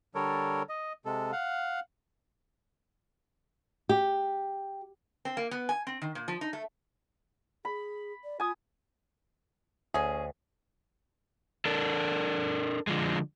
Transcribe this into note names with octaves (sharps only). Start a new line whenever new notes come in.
D3 G3 A4 A#4 C#5
D#5
C3 G#3 A4
F5 F#5
G4
C4
A#3
B3
G#5
C4
D#3
A#2
F3
D#4
A3
G#4 B5
D5
F4 G#5 D#6
D2 C#4 G#4
D4 A4 A#4
D3 F3 G#3